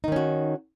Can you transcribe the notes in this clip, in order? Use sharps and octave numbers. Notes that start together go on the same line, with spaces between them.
D#3 C#4 D#4 F#4